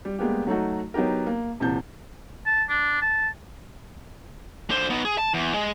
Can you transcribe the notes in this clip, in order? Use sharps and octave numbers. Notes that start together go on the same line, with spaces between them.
G3
G3 G#3 A#3 B3 G4
F#3 A3 D#4 F#4
F#3 B3 D#4 G4 A#4
A#3
D#1 C3 E3 A5 G6
A5
D4
A5
D3 C5
B3 D#4
G#4
A5
E2
G#3